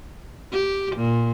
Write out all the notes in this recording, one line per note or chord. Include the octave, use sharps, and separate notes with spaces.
G4
A#2